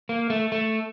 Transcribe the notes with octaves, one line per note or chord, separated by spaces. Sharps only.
A#3
A3
A3